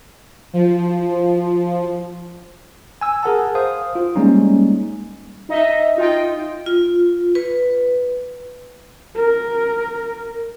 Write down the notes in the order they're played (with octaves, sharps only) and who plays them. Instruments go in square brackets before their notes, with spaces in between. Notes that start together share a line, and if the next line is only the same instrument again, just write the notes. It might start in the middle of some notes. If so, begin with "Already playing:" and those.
[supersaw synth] F3
[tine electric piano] G#5 E6
G#4 A#4 F#5 A5
C5 F5 D#6
F4
G3 G#3 A#3 C#4 D#4
[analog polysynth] D#4 D#5 E5
D#4 F4 D#5 G5
[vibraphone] F4
B4
[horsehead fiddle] A#4